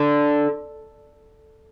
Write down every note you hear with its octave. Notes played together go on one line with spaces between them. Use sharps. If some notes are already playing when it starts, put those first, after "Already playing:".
Already playing: D3